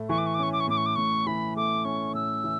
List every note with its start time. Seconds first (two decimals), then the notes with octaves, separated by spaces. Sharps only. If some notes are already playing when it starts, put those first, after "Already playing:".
Already playing: A2 A3
0.09 E3 C#6
0.18 D6
0.27 C#6
0.35 D6
0.39 C#4 C#6
0.53 D6
0.60 C#6
0.68 A2 D6
0.77 C#6
0.86 D6
0.96 A2 C#6
1.26 E3 B5
1.56 A3 D6
1.85 C#4 C#6
2.14 A2 E6
2.44 E3